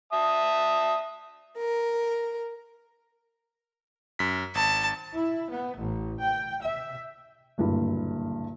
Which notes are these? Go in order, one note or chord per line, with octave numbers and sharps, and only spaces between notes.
E5 A5 D#6
A#4
F#2 B6
G#1 A5
E4
B3
A1
G5
E5
F#1 D2 G2 A#2 E4